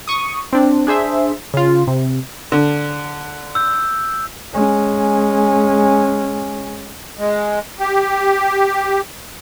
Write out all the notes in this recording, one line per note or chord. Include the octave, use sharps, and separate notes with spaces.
C#6 D#6
C4 D4
D4 G#4 C5 E5
C#3 F4
C3
D3
E6 G6
G#3 C#4
G#3
G4